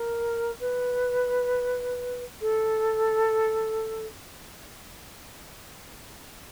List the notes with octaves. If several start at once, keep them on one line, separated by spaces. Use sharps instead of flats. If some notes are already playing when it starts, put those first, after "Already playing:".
Already playing: A#4
B4
A4